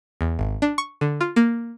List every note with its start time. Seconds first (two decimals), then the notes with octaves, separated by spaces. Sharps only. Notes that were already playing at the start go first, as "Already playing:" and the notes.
0.21 E2
0.39 G#1
0.62 D4
0.78 C#6
1.01 D3
1.21 F4
1.36 A#3